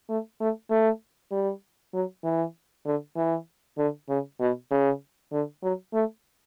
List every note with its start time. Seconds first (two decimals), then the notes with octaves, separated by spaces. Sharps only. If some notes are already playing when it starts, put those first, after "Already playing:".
0.09 A3
0.40 A3
0.71 A3
1.31 G3
1.94 F#3
2.24 E3
2.86 D3
3.17 E3
3.78 D3
4.09 C#3
4.40 B2
4.71 C#3
5.32 D3
5.63 F#3
5.94 A3